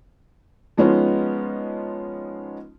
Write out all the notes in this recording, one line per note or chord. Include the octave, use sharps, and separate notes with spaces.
F3 G#3 B3 C#4 D#4 F4